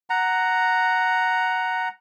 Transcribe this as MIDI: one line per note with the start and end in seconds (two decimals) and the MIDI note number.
0.10 1.89 78
0.10 1.89 82